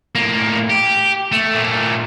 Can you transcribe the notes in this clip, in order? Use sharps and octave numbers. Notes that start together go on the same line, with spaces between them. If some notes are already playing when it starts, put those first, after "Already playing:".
A2 A#3
G4
A3
A#2 A3